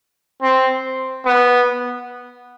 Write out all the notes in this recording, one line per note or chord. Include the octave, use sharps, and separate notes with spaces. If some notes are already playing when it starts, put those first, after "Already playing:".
C4
B3